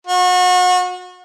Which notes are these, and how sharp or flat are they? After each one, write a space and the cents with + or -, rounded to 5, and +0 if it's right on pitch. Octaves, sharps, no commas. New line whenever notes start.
F#4 -35